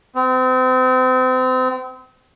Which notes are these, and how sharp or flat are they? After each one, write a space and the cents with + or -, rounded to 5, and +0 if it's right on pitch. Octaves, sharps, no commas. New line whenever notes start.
C4 -35